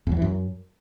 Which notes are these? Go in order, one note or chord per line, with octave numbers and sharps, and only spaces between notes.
E2
F#3
E3
F#2